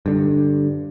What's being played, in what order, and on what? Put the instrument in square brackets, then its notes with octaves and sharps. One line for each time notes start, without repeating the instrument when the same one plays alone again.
[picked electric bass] G2 D3